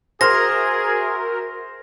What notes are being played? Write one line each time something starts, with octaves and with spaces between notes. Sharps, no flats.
F#4 G#4 A#4 C5 E5 C6 F6 A#6